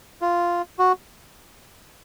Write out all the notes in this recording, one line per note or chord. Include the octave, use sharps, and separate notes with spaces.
F4
F#4